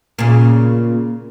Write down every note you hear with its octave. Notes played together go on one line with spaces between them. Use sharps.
A#2 C#3